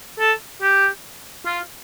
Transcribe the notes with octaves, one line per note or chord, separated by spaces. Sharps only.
A4
G4
F4